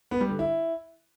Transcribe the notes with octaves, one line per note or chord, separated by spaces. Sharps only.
B3
G3
D3
E4